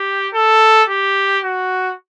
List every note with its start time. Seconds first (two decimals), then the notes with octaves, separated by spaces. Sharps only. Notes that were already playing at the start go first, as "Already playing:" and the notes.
Already playing: G4
0.34 A4
0.89 G4
1.44 F#4